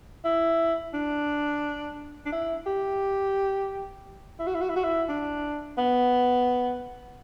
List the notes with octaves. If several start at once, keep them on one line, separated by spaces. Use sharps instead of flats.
E4
D4
D4
E4
G4
E4
F#4
E4
F#4
E4
F#4
E4
D4
B3